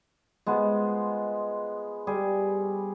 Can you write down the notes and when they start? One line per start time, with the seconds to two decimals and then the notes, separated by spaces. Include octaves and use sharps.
0.46 G#3 B3 F4 C5
2.07 G3 G#4